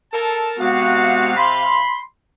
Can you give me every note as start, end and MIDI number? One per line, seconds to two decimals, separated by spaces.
0.12 0.55 69
0.12 0.55 70
0.12 0.55 81
0.59 1.84 48
0.59 1.35 56
0.59 1.35 59
0.59 1.35 66
0.59 1.84 77
1.37 1.99 83
1.37 1.99 84